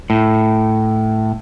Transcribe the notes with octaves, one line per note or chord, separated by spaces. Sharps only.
A2